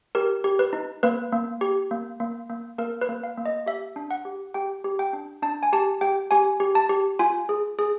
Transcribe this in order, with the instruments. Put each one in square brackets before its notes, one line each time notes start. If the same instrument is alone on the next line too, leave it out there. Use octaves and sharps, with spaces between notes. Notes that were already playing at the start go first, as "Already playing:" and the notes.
[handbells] G4 A#4
G4
B4
D#4
A#3 B4
A#3
G4
A#3
A#3
A#3
A#3 A#4
B4
A#3
F5
A#3
D#5
G4 E5
D4
F#5
G4
G4 G5
G4
G5
D4
D4 A5
G#5
G4 A5
G4 G5
G4 G#5
G4
A5
G4
F4 G#5
G#4
G#4